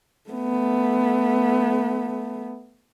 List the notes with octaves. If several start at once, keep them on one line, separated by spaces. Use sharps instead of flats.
A3 B3